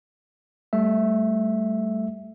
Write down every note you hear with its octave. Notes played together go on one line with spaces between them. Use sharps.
G3 A3 E5